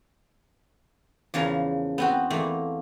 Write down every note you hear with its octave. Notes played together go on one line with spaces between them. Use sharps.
E2 C#3 F3 A#4
B3 C4 F#4
E2 A3 A#3